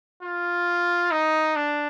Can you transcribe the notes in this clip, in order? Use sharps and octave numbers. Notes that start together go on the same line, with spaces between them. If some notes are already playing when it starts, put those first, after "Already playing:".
F4
D#4
D4